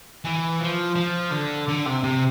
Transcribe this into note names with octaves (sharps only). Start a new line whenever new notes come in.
E3
F3
F3
D3
D3
C3
C3